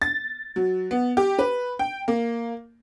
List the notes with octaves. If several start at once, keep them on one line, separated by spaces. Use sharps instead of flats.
A6
F#3
B3
G4
B4
G5
A#3